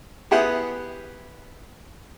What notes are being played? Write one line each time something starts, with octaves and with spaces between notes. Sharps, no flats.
B3 E4 G4 G#4 E5 F#5